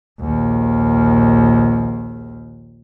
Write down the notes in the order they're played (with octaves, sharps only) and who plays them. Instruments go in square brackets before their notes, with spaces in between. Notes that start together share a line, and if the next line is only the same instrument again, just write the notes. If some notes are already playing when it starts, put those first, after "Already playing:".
[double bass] A#1 D#2